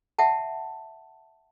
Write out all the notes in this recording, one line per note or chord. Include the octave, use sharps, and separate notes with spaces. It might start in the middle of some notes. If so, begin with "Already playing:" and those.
E5 F#5 G5 A5